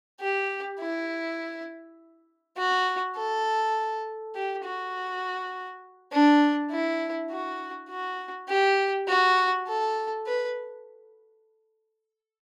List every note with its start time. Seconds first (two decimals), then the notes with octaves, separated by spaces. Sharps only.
0.21 G4
0.80 E4
2.57 F#4
3.16 A4
4.35 G4
4.64 F#4
6.12 D4
6.71 E4
7.31 F#4
7.89 F#4
8.48 G4
9.08 F#4
9.68 A4
10.26 B4